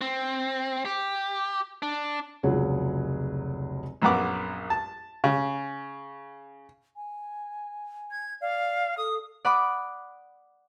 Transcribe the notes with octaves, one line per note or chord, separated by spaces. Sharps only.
C4
G4
D4
F1 C#2 F#3 F4 G#4 F#5
A#1 F#2 B3 F#5 D6
A5
C#3
G#5
G#6
D5 F5
A4 D#6
D5 F#5 B5 D6 D#6